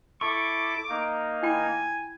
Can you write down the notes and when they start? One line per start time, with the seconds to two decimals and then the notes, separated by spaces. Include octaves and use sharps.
0.21 E4 A4 C#6 D6
0.89 A#3 D#4
1.43 E4 G5 G#5 B5